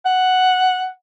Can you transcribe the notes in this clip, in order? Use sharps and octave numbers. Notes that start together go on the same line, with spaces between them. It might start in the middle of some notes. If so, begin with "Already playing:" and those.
F#5